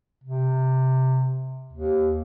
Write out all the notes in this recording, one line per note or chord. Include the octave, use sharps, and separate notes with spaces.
C3
D#2